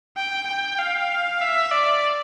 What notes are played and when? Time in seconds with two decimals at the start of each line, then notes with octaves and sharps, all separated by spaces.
0.16 G5
0.47 G5
0.79 F5
1.41 E5
1.71 D5